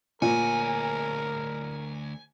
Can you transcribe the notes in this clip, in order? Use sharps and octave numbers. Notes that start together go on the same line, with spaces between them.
D2 A#2 F4 A#4 C#5 G#5